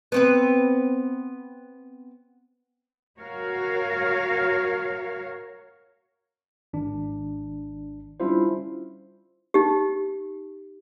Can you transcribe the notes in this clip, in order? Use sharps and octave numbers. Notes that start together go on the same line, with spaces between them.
B3 C4 B4
F#4 A#4 C#5 F5
G#1 D4
G3 C#4 D4 E4 F4 C5
D#4 G4